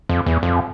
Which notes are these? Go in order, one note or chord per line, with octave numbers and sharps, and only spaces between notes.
F2
E2
F2